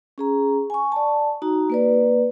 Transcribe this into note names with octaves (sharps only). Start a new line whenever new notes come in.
C#4 G#4 A#5
G#5 C#6
D5 A5
D#4 F#4 A#5
A#3 B4 D5